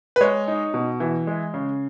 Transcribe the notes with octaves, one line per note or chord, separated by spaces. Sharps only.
B4
G#3 C#5
D#4
B2
E3
G#3
C#3